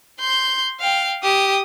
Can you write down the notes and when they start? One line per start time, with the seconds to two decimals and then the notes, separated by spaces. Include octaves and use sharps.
0.20 C6 G6
0.80 F5 G5
1.24 G4 D#6